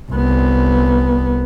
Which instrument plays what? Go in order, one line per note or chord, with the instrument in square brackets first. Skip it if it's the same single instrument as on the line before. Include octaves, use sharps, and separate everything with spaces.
[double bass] C2 B3